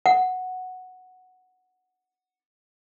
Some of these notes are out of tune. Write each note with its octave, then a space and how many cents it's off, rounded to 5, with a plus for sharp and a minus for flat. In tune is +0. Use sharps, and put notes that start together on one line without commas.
F#5 +0